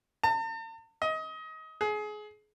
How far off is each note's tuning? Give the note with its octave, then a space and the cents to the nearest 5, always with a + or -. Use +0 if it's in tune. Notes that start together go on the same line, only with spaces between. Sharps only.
A5 +45
D#5 +25
G#4 +25